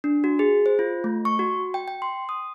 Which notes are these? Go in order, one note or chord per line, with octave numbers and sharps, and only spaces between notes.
D4
F#4
G#4
C5
F4
A3
C#6
F#4
G5
G5
C6
D#6